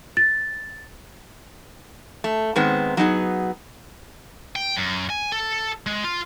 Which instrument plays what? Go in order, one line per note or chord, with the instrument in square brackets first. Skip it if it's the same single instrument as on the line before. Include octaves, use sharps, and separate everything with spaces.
[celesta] A6
[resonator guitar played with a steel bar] A3
G#2 D#3 G#3 B3 C4
F#3 B3 D#4 G#4
[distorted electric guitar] G5
F#2
G#5
A4
G#3
F4